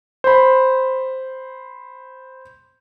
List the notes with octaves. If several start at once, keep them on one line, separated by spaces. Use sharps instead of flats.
C5 B5